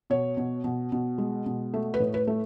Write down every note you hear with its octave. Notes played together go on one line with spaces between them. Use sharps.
B2 C#5
B2
B2
B2
G#3
B2
A3
B4
A2
B4
A3